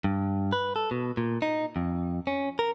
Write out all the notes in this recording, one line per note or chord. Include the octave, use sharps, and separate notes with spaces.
G2
B4
A4
B2
A#2
D#4
F2
C#4
A#4